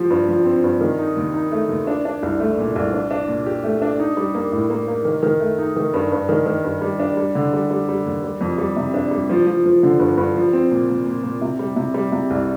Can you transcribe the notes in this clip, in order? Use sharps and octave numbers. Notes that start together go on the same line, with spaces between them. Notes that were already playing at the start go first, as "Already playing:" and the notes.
Already playing: F3 G4
G2
F3
C4
G2
D#3
D#4
D#2
D#4
A3
D#2
D4
D4
C2
A3
A#2
C2
D4
D4
A#2
G4
A3
D4
D#4
G3
A#3
A2
A#3
A#3
D#3
D#3
A3
D#4
D#3
G2
G2
D#3
D#3
G2
G3
D4
G3
D3
G3
G3
G3
D#2
G3
F2
G3
C3
D4
G3
F3
F3
F3
D3
G2
G2
F3
C4
A#2
A#2
A#2
A#2
C3
G3
C3
G3
C3
C2